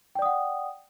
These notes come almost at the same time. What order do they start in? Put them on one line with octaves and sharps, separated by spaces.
G5 D5 D#6 F#5